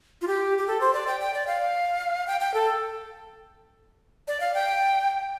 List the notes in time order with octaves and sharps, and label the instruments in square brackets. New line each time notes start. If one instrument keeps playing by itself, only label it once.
[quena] F4
G4
G4
A4
C5
D5
G5
G5
D5
F5
G5
G5
A4
D5
F5
G5